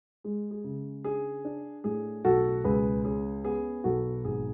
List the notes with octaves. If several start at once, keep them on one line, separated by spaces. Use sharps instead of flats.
G#3 G#4
G#4
C#3
D4 G#4
D4
A2 G#4
B1 F#4 A4
C#2 G#4 B4
C#4 G#4
B3 G#4
B1 F#4 A4
G#1 G#4